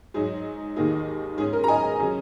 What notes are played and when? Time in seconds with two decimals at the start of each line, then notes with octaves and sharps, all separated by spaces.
0.14 G#2 F#3 D#4 G#4
0.76 D#2 D#3 A#3 D#4 G#4
1.38 G#2 G#3 C#4 G#4
1.53 A#4
1.64 A#5
1.68 D#5 G#5
1.99 C#3 F#3 C#4